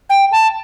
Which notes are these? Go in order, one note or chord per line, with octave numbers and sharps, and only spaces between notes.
G5
A5